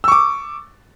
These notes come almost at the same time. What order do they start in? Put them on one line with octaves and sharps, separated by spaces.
E6 C#6 D6